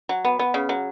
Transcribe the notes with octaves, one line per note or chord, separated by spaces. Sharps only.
F#3
B3
B3
C#3
F#3